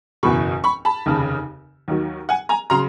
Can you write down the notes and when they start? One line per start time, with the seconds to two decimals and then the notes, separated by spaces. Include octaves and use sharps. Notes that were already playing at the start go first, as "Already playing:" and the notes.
0.23 F#1 E2 B2 B5 C#6
0.64 B5 C#6
0.85 A5 B5
1.06 F1 D#2 C#3
1.88 D#2 D#3 F#3
2.29 F#5 G#5
2.49 G#5 A#5
2.70 C#3 F#3 A#5 C6